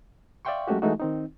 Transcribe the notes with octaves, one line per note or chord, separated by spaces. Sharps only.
D5 E5 F5 G5 C6 C#6
F#3 G#3 A3 C#4 F#4 G4
E3 G#3 A3 D#4 F#4
D#3 C4 D#4